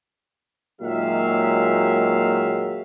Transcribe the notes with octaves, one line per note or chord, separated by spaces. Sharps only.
A#2 D#3 F#3 G#3 E5 F5